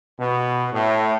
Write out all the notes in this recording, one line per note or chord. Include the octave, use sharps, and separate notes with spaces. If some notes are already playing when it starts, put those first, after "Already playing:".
B2
A2